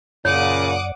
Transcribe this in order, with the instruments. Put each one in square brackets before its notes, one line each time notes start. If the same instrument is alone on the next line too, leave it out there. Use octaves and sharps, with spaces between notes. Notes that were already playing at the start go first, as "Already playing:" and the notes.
[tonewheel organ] F#2 D5 [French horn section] A#2 C#3 [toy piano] C#5 [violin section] F#5 D6 D#6